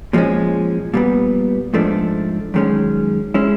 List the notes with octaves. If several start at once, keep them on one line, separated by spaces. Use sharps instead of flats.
A#2 F3 G#3 C#4
A#2 G3 B3
G#2 F3 A3 D4
F#2 D#3 G#3 C#4
G#3 C#4 E4